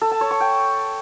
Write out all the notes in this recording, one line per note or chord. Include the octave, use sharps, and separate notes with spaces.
A4
A5
C#5
C#6
G5